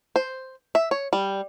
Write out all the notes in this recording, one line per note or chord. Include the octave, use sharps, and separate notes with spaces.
C5
E5
C#5
G3